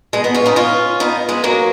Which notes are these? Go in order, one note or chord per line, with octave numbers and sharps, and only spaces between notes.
G#3 B3
B3 D#4
C#4 F4
B3 D#4
C#4 F4
B3 D#4
G#3 B3
F#3 A#3